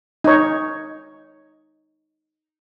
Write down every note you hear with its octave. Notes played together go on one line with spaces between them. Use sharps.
D#4 C#5